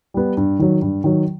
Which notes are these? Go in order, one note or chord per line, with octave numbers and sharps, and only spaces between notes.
G3 B3
G2
D#3 F#3
G2
D#3 F#3